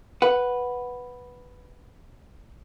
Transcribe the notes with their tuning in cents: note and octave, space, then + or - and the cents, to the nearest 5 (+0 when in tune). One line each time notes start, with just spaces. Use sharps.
B4 +0 F#5 +0